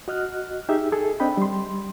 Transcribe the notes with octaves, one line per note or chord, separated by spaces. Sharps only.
F#4 D#5 F6 F#6
D#4 G4 G#4 E5
G#4 A4
C4 D4 D#5 G5 B5
G3 C6